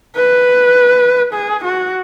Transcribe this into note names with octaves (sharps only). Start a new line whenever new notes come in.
B4
G#4
F#4